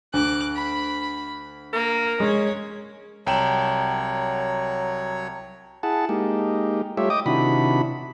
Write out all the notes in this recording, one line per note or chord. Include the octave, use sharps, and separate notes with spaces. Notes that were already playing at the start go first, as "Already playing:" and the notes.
D2 D6 F#6
B5
A#3 A#4
G#3 C#4 C#5
C2 F#3 C#5 G5 A5 A#5 E7 F#7
E4 G#4 F#5 A5
G#3 A#3 D#4 G4
G3 A3 F4 G4 C#5 E5
D#5 G5 D6 D#6
C3 D#3 D4 E4 F#4 B5